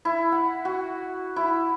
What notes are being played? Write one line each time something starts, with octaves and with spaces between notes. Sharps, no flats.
E4
F#5
F#4
E4